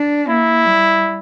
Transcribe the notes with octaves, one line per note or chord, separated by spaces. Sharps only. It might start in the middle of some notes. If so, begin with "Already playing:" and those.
Already playing: D4
A#3 E4
G3